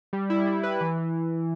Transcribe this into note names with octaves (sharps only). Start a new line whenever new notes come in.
G3
E4
G3
B4
E3
E3